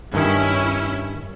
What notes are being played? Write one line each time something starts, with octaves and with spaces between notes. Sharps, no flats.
G2 D#3 C#4 E4